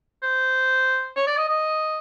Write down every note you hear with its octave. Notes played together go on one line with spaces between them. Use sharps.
C5
C#5
D5
D#5
D#5